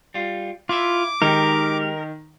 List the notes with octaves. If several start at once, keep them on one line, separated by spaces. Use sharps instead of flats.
G3 F4
E4 F4 E5 D6
D#3 G#3 D#4 G4 A#4